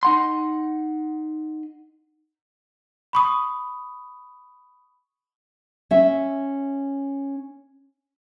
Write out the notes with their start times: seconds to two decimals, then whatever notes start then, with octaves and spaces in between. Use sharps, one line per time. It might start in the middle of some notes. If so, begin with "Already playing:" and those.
0.03 D#4 F#5 C6
3.13 B5 C#6 D#6
5.91 C#4 E5